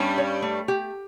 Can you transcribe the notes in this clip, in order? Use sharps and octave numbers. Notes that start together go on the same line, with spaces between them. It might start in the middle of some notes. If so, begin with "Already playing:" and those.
Already playing: G2 G3 C#4
C#5
A3
G4